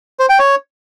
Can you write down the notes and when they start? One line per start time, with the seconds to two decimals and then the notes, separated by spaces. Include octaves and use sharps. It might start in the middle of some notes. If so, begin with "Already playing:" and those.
0.19 C5
0.29 G5
0.39 C#5